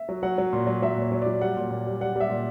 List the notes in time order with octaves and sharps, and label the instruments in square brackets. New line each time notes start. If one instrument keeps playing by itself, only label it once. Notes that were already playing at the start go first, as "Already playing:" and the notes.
Already playing: [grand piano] E5
F#3
F#3 F#5
F#3
A#2
F#3
F#3 E5
A#2 C#5
F#3
F#3 D5
G3 F#5
A#2
A#2
G3
G3 F#5
G3 E5
A#2